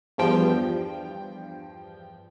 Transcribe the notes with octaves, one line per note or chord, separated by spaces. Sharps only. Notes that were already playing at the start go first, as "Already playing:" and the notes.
E2 G2 F3 G5